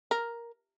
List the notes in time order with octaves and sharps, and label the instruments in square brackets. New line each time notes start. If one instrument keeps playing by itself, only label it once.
[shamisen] A#4